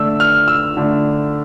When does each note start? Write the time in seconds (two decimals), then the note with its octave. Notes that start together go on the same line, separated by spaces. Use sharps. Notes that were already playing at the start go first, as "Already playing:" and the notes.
Already playing: D3 A3 D4 E6
0.20 F6
0.48 E6
0.77 D3 A3 D4